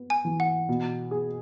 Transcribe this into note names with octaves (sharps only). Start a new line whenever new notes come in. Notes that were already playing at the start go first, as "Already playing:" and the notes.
Already playing: B3
G#5
E3
F#5
B2
G#4